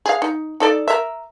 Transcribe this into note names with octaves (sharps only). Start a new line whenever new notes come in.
G#4 F5
D#4
D#4 A4 D5
A#4 E5